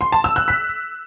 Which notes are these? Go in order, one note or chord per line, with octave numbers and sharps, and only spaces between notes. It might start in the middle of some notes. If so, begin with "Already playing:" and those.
C6
A5
E6
F#6
B6